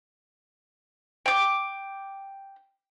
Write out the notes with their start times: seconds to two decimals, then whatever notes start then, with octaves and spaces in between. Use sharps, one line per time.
1.26 G5 D6